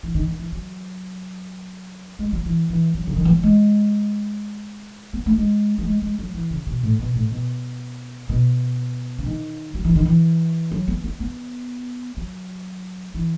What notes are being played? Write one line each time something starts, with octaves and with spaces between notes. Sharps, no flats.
E3
D#3
D#3
E3
F#3
G#3
F#3
E3
E3
F#3
C#3
D#3
E3
F#3
G#3
B3
A3
G#3
F#3
G#3
G#3
F#3
E3
C#3
B2
A2
B2
A2
B2
B2
C#3
D#3
F#3
E3
D#3
E3
F#3
B3
B3
B3
F#3
E3